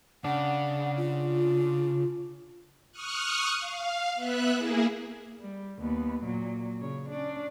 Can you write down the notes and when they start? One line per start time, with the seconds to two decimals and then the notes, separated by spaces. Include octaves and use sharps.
0.24 C#3 D4 F#5
0.97 F4
2.92 C#6 D#6 F6 F#6
3.57 F5
4.15 B3 E5 F#6
4.55 A#3 E4 G#4
5.40 G3
5.79 D#2 B3
6.24 A#2 F#3
6.80 C#3 C#5
7.10 C#4 D4